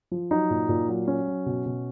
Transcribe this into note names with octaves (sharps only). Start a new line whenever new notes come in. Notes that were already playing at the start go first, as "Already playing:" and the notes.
F3
F#3 D#4
A#2
A#2
F#3
F#3 C#4
F#3
B2
B2